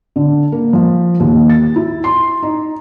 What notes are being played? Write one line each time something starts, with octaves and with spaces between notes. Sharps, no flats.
D3
A#3
F3
D#2
A6
E4
C6
D#4